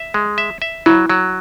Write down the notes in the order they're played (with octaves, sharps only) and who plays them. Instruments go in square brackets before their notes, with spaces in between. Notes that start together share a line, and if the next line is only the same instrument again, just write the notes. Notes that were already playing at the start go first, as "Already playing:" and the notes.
Already playing: [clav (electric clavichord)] E5
G#3
E5
E5
[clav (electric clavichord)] F#3 [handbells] E4
[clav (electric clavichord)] F#3